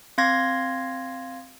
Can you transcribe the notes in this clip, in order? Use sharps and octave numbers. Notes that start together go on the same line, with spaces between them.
C4 F5 C6 G#6 A#6